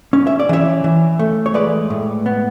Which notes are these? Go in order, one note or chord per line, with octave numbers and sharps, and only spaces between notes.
C#4
E5
D5
E3 C#5 E5
E3
A3
C#5
G#3 B4 D5
A2
B3